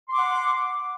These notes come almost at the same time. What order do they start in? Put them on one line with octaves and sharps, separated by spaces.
C6 D6 F#5